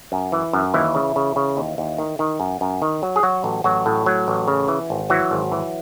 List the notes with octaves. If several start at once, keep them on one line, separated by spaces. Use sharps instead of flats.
F#2
E3
F#2
D#2 E3 E4
C#3
C#3
C#3
D#2
D#2
D#3
D#3
F#2
F#2
D#3
F#3
G#4
F#3 F#4
A1
A1 F#3 F#4
A2
F#3
A1
C#3
E3
G#1
E3 F#3 F#4
G#1
E3